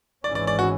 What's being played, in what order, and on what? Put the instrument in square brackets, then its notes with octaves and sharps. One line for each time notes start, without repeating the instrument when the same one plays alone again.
[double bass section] G#1 G#2 E3 G#3 C#4 [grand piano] D5
[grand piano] D5
D5
F#4